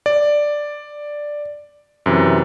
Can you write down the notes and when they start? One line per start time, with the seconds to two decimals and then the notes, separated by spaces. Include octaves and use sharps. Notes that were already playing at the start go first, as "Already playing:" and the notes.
0.06 D5
2.06 F#2 C3 E3